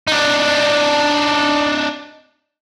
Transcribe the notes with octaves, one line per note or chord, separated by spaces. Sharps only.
D4 D#4